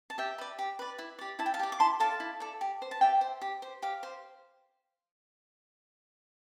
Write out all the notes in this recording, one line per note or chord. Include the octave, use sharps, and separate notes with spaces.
A5
G4 E5 G5
B4 D5
G4
B4 D5
E4
G4 D5
E4 A5
G5
F5 A5
G4 D5
D6
E4 A5 C6
A4 D5 F5 A5
E4
A4 D5
G4
C5
A5
G4 E5 G5
C5
G4
C5
G4 F5
C5